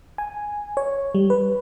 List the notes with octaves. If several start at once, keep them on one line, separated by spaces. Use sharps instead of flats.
G#5
C#5
G3
B4